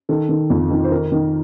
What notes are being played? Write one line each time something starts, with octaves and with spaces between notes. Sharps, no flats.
D#3 A4
D#3
F2
D#3
C5
D#3 A#4
D#3